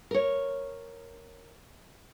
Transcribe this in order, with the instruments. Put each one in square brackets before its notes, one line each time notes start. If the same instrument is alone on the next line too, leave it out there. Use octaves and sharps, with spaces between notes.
[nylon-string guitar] A#4 C#5